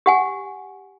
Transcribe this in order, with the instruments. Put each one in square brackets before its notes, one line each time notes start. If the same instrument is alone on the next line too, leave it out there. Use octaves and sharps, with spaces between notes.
[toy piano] G4 F#5 G#5